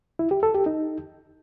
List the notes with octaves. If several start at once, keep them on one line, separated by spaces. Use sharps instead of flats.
E4
G4
A4
G4
D#4